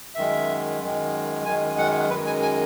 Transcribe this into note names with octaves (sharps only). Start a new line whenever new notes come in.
F#2 D#3 G#3 E5
F#2 D#3 G#3
F#2 D#3 G#3 G#5
F#5
F#2 D#3 G#3 B4
G#5
G#5